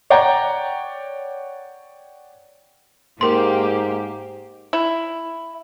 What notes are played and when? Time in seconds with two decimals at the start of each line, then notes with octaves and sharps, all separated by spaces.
0.10 C#5 D5 F#5 G5 A#5
3.21 G#2 A#3 G4 A#4 C6
4.73 E4